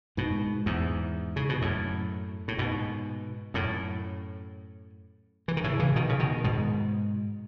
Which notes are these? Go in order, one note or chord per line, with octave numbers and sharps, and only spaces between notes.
G#2 B2
E2 G#2
C#3
B2
F#2 A2
A2
G#2 B2
F#2 A2
E3
D#3
A2 C#3
C#3 E3
B2 D#3
C#3
B2 D#3
G#2 B2